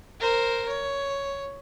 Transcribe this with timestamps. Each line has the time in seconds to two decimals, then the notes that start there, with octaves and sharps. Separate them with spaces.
0.20 A#4 C5
0.68 C#5